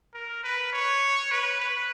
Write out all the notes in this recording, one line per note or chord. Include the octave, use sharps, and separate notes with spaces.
A#4
B4
C#5
B4
B4